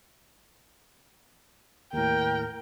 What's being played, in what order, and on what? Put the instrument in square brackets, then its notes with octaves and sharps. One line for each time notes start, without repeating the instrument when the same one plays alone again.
[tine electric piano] D#2 A2 [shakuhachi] A#4 [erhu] G5